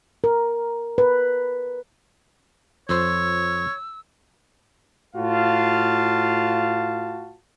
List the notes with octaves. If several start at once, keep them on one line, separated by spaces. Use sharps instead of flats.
A#4
B4
F2 C5 C#5 E6
A2 F4 F#4 F5 A5